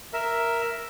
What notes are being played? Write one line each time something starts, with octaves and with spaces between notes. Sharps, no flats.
A#4 E5